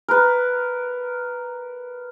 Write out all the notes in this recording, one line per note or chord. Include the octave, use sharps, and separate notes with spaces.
A#4 B4